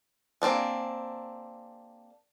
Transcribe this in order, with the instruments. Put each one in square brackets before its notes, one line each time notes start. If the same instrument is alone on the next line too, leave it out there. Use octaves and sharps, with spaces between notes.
[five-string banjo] A#3 C4 D4 G#4